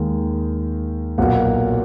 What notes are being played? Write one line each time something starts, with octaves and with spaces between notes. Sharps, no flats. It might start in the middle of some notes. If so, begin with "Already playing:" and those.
Already playing: D#2 D#3 G#3
B1 A#2 F#3 A#3 F#5